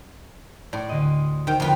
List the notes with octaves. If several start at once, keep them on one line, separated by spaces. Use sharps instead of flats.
A2 D5 C6
D2 D3 D#5
D#3 C5 G5 F6
F2 D3 F4 B4